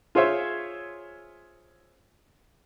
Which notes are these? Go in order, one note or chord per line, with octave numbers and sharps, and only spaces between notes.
F4 G#4 C5 C#5 E5